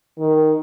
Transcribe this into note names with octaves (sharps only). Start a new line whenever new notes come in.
D#3